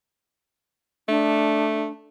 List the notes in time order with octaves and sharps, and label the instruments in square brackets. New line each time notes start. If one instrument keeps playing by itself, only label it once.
[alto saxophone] A3 [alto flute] D4